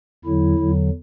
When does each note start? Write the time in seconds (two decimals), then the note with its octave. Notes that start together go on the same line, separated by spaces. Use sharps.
0.25 E2 D3 F#3 E4
0.58 E2 D3 F#3